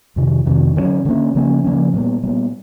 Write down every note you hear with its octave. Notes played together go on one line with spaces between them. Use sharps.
F2 C3 D#3
F2 C3 D#3
D3 F#3 A#3 C#4
D3 F#3 A#3 C#4
C#3 F3 A#3 C#4
C#3 F3 A#3 C#4
A#2 G3 B3
A#2 G3 B3